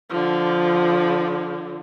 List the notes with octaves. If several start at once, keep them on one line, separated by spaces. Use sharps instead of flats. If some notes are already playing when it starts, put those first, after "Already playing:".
D3 F3